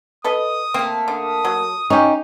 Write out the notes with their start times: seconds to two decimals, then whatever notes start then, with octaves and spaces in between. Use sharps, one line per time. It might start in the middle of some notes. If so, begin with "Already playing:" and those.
0.24 A4 B4 D#5 D#6
0.74 A3 A#3 C4
1.08 D3 D#6
1.45 F#3
1.90 C#4 D#4 G4